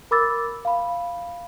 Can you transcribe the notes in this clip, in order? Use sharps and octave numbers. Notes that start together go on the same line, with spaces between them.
A#4 B5 D6 E6 A6
F5 B5